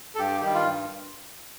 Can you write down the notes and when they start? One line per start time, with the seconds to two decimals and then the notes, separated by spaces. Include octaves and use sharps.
0.15 A4
0.19 G2 G4
0.41 D#3 G3 G4
0.54 F4
0.63 G2